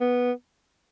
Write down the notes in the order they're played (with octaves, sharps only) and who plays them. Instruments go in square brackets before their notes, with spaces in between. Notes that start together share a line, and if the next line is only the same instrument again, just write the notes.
[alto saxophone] B3